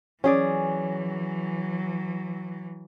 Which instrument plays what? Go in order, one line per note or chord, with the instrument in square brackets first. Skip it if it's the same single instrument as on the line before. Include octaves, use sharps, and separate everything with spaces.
[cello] E3 F#3 [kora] C#4 G#4 D5